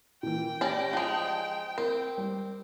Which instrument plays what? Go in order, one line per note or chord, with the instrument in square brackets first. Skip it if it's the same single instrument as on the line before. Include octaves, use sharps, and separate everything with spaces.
[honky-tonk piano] A#2 E3 [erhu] G5
[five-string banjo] C#4 D5 A5 [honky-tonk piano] G4 A#6
[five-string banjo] F3 G#3 [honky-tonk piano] A5 D#6
[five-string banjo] C4 [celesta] A#4
[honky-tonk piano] G3